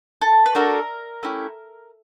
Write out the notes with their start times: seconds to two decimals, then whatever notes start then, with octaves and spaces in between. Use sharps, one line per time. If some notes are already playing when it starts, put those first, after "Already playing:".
0.21 A4
0.46 B4
0.55 A3 D4 F#4 A4 A#4
1.23 A3 C#4 E4 G4